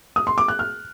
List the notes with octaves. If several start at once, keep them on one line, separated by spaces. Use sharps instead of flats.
D#6
C6
D6
F#6
F6